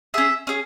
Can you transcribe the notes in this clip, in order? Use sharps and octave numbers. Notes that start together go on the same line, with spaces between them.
C#4 G#4 E5
C#4 G#4